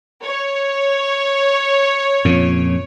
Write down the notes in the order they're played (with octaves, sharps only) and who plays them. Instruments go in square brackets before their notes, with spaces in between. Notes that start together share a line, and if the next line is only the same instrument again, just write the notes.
[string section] C#5
[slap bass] F2 A#2 C#3